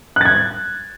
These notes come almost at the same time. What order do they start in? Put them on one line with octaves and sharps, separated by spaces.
F#6 A6 G#6